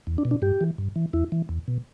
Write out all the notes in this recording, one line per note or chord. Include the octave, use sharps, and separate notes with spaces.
E2
D4
B2
D4
G2 G4
E3
G2
E3
E2 E4
E3
E2
B2